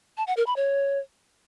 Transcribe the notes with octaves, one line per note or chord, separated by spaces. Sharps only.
A5
F#5
A#4
B5
C#5